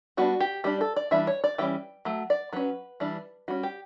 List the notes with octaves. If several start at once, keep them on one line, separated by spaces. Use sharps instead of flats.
G3 B3 D4 F#4
G4
G3 D4 G4
A4
D5
E3 G3 D4 E5
C#5
D5
E3 G3 C#4 G5
F#3 A3
D5
F#3 C#4 B4
E3 G3 D4
G3 C#4 F#4
G4